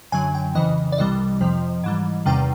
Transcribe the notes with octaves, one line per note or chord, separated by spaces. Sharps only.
F#2 D3 F#3 G#5
G5
F2 C#3 E3 D#5
D5
C2 C3 E3 G3 D#5
F2 C3 F3
G#2 E3 G3
E2 C3 D#3 G3 G5